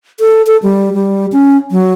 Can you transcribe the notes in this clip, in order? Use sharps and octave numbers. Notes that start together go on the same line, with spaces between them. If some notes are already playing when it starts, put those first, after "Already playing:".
A4
A4
G3
G3
C#4
F#3